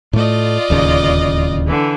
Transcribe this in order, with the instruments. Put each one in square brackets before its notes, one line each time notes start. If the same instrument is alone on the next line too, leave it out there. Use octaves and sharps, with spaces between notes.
[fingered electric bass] A2 A3 [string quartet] F4 D5 D#5
[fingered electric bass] D1 D#2 C#3
[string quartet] D3 E3